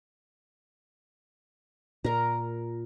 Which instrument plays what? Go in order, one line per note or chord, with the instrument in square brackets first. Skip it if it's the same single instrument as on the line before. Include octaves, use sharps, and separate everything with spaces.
[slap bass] A#2 [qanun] A#4 A#5